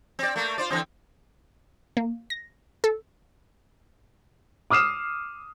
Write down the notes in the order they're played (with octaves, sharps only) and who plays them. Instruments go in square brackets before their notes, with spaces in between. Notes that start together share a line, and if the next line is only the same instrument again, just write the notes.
[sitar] C4 D5
A3 A#3
F4 C5 D5
D3 E3 C4
[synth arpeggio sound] A#3
A#6
A4
[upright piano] D6 D#6 F6 C7 E7